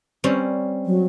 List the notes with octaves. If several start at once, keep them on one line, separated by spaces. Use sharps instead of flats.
G3 C4 C#4
F#3